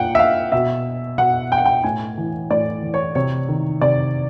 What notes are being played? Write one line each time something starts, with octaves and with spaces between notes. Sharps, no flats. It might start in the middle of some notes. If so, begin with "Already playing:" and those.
Already playing: A#2 F#5 G5
E5
F5
B2 E5
B2 F#5
G5
F#5
G5
A2 G#5
E3
A2 D5
E3
C#5
C3 C#5
D#3
C3 D5